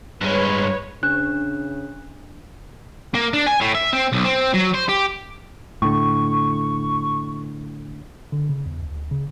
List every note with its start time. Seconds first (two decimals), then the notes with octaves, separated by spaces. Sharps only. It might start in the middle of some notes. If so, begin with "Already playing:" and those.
0.21 G2 G#3 B4 C#5
1.03 C#3 D4 F#6
3.14 A#3
3.34 D4
3.47 G#5
3.61 A2
3.75 E5
3.93 C4
4.12 B1
4.24 C4
4.54 F#3
4.74 C5
4.89 G4
5.82 A2 D3 C#6
8.32 D3
8.49 C#3
8.66 E2
8.83 D2
9.11 C#3